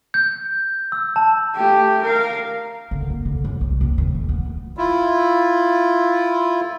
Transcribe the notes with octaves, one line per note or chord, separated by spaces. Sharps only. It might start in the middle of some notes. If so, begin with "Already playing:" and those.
G6
E6
A5
A3 G4
A#4 F5
D3
A#3
D3
F#2
C2
D#2
D#3
D#1
B3
D#3
E4 F4